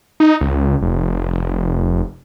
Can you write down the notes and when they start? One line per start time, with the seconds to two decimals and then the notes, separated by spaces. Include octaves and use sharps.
0.20 D#4
0.41 C#2
0.81 F1